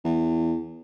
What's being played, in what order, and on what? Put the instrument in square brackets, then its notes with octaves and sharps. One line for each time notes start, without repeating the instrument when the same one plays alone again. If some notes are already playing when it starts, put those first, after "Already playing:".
[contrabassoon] E2